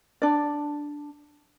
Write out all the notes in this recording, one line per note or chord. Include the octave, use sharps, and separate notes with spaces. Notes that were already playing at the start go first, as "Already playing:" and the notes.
D4 D5